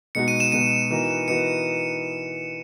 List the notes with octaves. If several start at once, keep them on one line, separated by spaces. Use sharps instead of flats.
B2 G#3 D#4 F#4 C#7
D#7
E7
B2 G#3 D#4 F#4 D#7
E3 B3 D#4 F#4 A#4
E3 B3 D#4 F#4 A#4 C#7